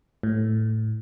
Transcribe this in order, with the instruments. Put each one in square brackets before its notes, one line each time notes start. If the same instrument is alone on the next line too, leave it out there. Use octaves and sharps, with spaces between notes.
[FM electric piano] A2